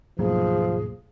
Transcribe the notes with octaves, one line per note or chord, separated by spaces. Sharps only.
D2 G#2 B2 D3 F3 F#3 A#3 G#4